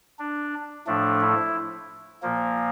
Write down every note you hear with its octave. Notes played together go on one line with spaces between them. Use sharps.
D4
A2 F3 A3 D4
E4
A#2 F3 A#3